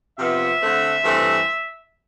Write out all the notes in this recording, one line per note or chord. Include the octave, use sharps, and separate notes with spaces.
C3 F3 B3 E5
D3 A3 C4
G2 E3 A3 C4